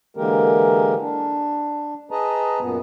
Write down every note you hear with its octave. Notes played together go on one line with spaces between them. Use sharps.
D3 E3 G#3 A#3 G4 A#4
D4
G#4 B4 D#5 A5 A#5
F#2 A#2 B3